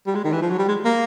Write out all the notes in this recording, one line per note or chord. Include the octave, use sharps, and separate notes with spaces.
G3
G#3
D#3
E3
F3
F#3
G3
G#3
A#3